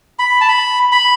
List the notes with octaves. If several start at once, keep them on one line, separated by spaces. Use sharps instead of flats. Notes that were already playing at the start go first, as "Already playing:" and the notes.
B5
A5
B5
B5